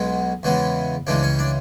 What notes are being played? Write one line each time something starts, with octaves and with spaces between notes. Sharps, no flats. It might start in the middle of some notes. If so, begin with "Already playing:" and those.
Already playing: B1 B2 G#3 B3
E2 C#3 E3 G#3 B3
C#2 C#3 E3 G#3 D4
C#4
D4